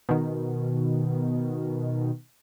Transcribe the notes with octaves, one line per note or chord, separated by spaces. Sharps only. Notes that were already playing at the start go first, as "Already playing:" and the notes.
B2 D#3